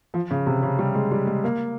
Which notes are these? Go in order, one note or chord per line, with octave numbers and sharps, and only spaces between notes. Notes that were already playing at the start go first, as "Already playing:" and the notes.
F3
C#3
C3
C#3
G3
G#3
G3
G#3
A#3